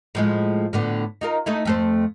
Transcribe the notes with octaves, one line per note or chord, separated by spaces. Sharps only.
A2 F3 G#3
A2 D3 B3
D#4 F4 A#4
A3 D#4 E4
F2 A3 C5